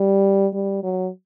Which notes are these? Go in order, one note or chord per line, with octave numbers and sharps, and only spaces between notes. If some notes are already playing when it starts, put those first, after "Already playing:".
Already playing: G3
G3
F#3